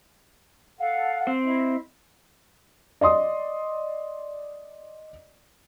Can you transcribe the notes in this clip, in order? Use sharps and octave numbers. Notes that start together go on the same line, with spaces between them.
A4 F5 F#5
C4 C5
E4 D#5 E5
D5 D#5 C6 D#6